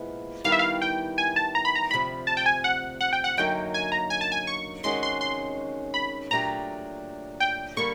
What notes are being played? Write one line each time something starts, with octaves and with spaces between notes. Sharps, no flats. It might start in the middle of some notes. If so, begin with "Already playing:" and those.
Already playing: A#2 F3 G#3 B3 E4
D#3 G3 B3 E4 G4 F5
E5
F5
G5
G#5
A5
A#5
B5
A#5
D2 C3 F3 B5
A5
G5
G#5
F#5
F#5
G5
F#5
F#2 D3 F#3 A#3 D#4 G5
G#5
A#5
G#5
A5
G#5
C#6
C3 D#3 G#3 C#4 F#4 C6
C6
C6
B5
A#2 F#3 A3 D4 G4 A#5
G5
D3 G3 A#3 D4 C#6